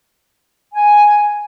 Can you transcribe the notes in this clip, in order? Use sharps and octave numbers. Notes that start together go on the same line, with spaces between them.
G#5